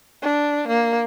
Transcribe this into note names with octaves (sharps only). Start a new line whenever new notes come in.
D4
A#3